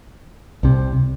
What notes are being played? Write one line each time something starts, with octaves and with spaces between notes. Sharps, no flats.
C2 C3